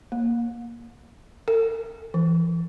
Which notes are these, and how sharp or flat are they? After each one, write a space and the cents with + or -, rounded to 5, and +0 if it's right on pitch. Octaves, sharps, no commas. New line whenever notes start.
A#3 +5
A4 +45
E3 +30